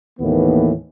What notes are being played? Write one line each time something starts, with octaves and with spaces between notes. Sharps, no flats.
D#2 A2 D#3 E3 A#3 B3